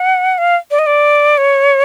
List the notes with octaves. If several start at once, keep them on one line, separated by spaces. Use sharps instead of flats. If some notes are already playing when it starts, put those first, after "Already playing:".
Already playing: F#5
F5
D5
D#5
D5
C#5